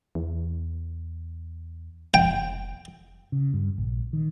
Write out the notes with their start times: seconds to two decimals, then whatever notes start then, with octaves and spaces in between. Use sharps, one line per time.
0.15 E2
2.14 F1 G5
3.32 C#3
3.54 G2
3.78 A#1
4.13 D#3